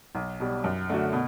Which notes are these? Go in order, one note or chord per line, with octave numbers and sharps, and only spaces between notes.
B1
B2 G3
F#2
D3 A3 D4 F#4
B2